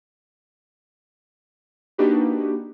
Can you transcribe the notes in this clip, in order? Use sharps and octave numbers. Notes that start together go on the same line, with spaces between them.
A#3 D4 D#4 F#4 G4 B4